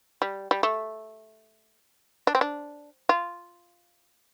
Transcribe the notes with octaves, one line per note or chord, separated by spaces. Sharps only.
G3
G3
A3
D4
C4
D4
F4